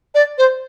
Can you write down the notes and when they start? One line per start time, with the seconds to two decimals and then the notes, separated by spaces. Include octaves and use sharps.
0.14 D5
0.38 C5